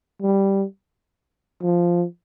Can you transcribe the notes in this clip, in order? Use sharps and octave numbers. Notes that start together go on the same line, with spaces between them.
G3
F3